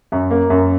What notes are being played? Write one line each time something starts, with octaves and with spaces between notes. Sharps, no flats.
F#2
A#3
F#2